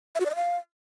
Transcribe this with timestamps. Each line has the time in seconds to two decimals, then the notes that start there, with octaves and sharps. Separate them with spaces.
0.15 E5
0.20 F#4
0.25 D5
0.30 D#5
0.35 F5